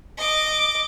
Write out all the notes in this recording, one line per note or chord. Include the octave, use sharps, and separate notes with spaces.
D#5 D6